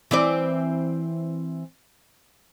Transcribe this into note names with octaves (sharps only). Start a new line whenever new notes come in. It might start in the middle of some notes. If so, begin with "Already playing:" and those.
E3 C4 D5